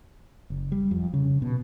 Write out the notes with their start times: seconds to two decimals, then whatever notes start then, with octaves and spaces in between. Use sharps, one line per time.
0.50 F#1
0.72 G3
0.91 F2
1.14 C#3
1.42 B2